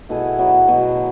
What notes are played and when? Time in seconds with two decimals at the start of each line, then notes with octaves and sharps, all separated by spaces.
0.09 B2 A3 E4 G#4
0.38 B2 F#3 B3
0.67 B2 F#3 B3